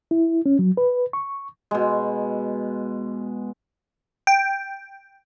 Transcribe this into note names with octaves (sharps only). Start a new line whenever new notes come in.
E4
C#4
F#3
B4
C#6
B2 G#3
G5